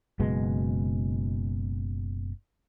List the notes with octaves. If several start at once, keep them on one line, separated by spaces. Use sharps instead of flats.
F#1 B2 G#3